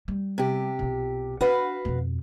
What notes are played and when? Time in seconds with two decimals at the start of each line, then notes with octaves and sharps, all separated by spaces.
0.08 G3
0.38 C3 G4
0.79 B1 F4
1.41 D4 F#4 B4 F5
1.85 F2 B2